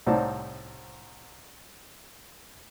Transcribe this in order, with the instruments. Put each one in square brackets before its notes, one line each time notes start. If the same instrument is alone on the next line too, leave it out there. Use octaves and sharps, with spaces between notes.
[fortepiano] C2 A2 C4 D#4 D5 A5